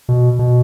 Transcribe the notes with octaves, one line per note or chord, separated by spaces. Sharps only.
B2
B2